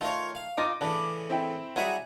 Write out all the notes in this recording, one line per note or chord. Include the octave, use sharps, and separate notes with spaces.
D#3 A3 F4 A#4 C#5
F5
D#3 D#4 F4 D6 A#6 D#7
A2 C#3 E3 D4 B4
C4 E4 G5
F#3 G3 F#4 G#4 E5 G#5